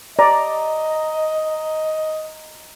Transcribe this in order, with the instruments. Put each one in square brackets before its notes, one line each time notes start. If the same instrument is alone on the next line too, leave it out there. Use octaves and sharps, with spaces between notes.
[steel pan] D5 [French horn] D#5 [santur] A#5